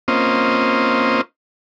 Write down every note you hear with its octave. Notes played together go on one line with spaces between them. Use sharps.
A#3 C4 C#4 F4 C5 D#5